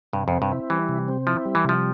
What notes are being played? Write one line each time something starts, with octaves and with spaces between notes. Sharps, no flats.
G2 C3
F2 C4
G2
E4
E3 G3
C3
C4
F3 E4
G3
E3
C3 F3